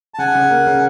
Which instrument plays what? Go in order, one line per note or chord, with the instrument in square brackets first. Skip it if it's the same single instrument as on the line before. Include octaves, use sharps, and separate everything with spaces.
[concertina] A5
[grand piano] C#3 [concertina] F#5 G#5
[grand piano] C#3
A#3
C#3